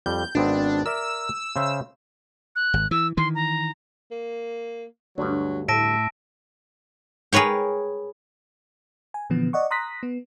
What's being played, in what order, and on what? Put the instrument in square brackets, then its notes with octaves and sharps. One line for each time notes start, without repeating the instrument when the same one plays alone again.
[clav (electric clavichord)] F2 G3 [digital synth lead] G6
[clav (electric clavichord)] G#1 B3 C4 [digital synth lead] D4
[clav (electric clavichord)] A#4 D5 E5 [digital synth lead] E6
[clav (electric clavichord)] C#3 C5 E5
[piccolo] F#6
[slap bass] G#1
[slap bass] E3 [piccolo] E6
[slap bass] D#3 E3 [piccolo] C6
[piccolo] A#5
[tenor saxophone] A#3
[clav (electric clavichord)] D2 G2 [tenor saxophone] F#3 [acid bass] D4
[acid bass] A2 [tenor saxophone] E5 [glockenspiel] A5 A#6 D7
[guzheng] G#4 A#4 B4 C#5 G5
[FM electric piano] G#5
A#2 D3 E3 F3 B3
D5 D#5 F#5 C#6
A#5 C6 D#6 F#6 A#6 B6
B3